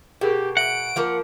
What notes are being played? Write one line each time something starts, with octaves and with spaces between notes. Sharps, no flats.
B2 G4 G#4 A#4
E5 F#5 D6 D7
F3 A#3 A#4